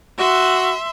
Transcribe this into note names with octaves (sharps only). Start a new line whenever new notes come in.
F#4 E5 C6